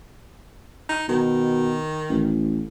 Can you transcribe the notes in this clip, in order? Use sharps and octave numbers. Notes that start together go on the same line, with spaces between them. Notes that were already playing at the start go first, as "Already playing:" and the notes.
D#4
B2 D#3
A1